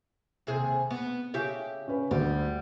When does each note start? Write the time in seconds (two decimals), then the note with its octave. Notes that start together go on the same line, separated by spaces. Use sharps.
0.47 D#2 C3 G#4
0.91 B3
1.34 C#3 G4 E5
1.88 C#4 B4
2.11 D2 G3